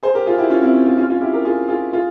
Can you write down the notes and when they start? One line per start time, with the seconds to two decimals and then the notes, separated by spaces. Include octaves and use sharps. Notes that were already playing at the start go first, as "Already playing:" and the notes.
0.03 G#4 C5
0.14 G4 A#4
0.26 F4 G#4
0.38 E4 G4
0.50 C#4 F4
0.62 C4 E4
0.74 C#4
0.86 C#4 F4
0.98 C#4 F4
1.09 C#4 F4
1.21 E4 G4
1.33 G4 A#4
1.45 F4 G#4
1.68 F4 G#4
1.93 F4 G#4